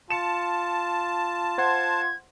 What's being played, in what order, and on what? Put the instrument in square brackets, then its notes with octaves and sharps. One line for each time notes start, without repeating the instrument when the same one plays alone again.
[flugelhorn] F4 [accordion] A5 [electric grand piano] C#7 E7
[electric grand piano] C5 F#5 C6 [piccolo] G#6